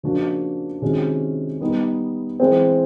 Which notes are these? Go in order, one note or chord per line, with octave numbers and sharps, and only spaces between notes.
C#3 F3 A#3 D4 F#4
C3 D#3 G#3 C#4 F#4
G3 B3 D#4
E3 G#3 C4